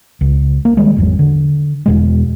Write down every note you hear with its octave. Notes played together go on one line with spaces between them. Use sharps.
C#2
A#3
D#3 G3 G#3
G#1 E2 F#3
D3
E2 B2 G#3